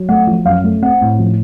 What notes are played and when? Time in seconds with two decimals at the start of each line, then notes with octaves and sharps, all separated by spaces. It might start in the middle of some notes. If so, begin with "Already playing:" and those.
Already playing: F#3
0.08 A3 F#5
0.27 F3
0.45 F#2 F5
0.64 A3
0.82 C4 F#5
1.01 A2
1.19 F3